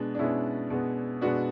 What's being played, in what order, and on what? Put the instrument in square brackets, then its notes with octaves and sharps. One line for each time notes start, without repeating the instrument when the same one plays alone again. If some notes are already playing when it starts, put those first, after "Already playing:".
Already playing: [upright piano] B2 G#3 B3 D4
D4
B2 G#3 B3 C#4 E4
B2 G#3 B3
B2 G#3 B3 D4 F#4